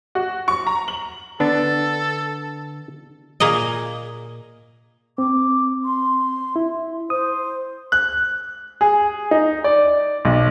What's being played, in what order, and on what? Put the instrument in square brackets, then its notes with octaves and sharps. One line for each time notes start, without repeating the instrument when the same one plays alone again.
[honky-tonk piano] F#4
C#6
A#5
F#7
[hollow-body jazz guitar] D3 [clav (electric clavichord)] B3 D4 [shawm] A4
[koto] A#2 A#3 G#4 D#5
[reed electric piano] C4 [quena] D6
[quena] C6
[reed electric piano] E4
[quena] C5 [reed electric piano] D#6
[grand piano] F#6
G#4
D#4
D5
B1